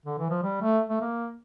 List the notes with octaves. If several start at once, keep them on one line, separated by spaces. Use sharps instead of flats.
D3
E3
F3
G3
A3
A3
A#3